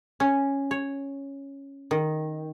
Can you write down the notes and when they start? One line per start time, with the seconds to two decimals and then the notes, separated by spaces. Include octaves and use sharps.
0.20 C#4
0.71 C#5
1.91 D#3